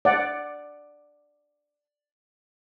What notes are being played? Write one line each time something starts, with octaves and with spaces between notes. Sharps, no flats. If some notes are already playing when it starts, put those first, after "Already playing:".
D5 F#5